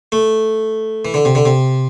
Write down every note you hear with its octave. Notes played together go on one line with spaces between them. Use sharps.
A3
E3
D3
C3
D3
C3